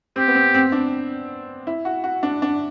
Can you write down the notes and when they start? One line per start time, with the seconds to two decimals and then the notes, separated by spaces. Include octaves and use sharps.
0.16 C4 G4
0.28 B3
0.35 C4
0.54 C4
0.72 D4
1.67 E4
1.85 F#4
2.04 F#4
2.23 D4
2.42 D4